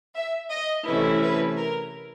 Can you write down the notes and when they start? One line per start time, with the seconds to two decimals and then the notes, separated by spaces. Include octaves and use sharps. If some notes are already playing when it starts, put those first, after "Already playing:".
0.16 E5
0.51 D#5
0.86 C3 E3 A3 C#4 E4 B4
1.22 B4
1.57 A#4